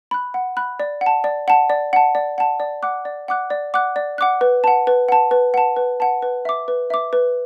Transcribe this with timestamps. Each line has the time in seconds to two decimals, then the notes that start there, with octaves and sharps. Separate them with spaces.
0.11 B5 F#6
0.34 F#5
0.57 B5 F#6
0.80 D5
1.01 F#5
1.06 A5
1.24 D5
1.48 F#5 A5
1.70 D5
1.93 F#5 A5
2.15 D5
2.38 F#5 A5
2.60 D5
2.83 F#5 D6 F#6
3.05 D5
3.28 F#5 D6 F#6
3.50 D5
3.74 F#5 D6 F#6
3.96 D5
4.18 F#5 D6 F#6
4.41 B4
4.64 F#5 A5
4.87 B4
5.09 F#5 A5
5.31 B4
5.54 F#5 A5
5.76 B4
6.00 F#5 A5
6.22 B4
6.45 E5 D6
6.68 B4
6.90 E5 D6
7.13 B4